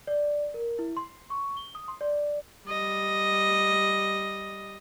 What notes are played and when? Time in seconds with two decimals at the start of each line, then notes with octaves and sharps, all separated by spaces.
0.07 D5
0.54 A#4
0.79 E4
0.97 C6
1.30 C#6
1.57 G7
1.75 D#6
1.88 C6
2.01 D5
2.68 G3 D#5